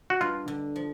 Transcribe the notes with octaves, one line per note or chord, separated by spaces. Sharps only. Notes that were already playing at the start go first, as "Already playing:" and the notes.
F#4
G2 F4
D3
F3